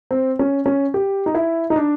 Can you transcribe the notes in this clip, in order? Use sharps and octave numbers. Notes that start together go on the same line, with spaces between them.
C4
C#4
C#4
G4
D#4
E4
D#4
D4